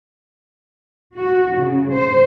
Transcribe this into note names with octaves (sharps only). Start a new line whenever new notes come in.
F#4
C#3
C5